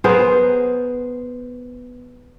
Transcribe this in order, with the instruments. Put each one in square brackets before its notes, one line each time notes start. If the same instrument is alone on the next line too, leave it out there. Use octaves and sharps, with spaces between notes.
[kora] B3 G#4 A#4 C5